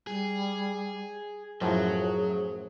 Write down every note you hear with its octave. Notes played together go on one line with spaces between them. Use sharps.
G3 G#4
F#2 A2 F3 F#3 G#4